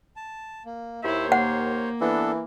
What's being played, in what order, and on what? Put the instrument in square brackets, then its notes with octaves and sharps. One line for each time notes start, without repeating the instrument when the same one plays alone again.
[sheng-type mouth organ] A5
A#3
[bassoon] D#2 [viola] E4 [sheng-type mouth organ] C5 C#5
[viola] A#3 [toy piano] F#5
[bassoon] E3 [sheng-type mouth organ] B3 D4 A4